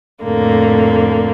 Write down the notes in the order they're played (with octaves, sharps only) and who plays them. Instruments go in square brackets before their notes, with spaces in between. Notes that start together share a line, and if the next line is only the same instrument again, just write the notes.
[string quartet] F2 A2 D3 A#3